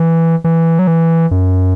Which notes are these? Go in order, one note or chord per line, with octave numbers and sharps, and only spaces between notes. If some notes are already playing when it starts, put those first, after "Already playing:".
Already playing: E3
E3
F#3
E3
F#2